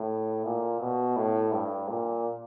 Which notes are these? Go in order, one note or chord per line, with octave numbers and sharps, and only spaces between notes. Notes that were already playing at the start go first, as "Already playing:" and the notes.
Already playing: A2
A#2
B2
A2
G2
A#2